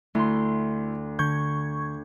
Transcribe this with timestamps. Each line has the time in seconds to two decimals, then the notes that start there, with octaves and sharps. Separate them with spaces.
0.15 D2 A3 E4 C6
1.19 D3 C#6 G6 G#6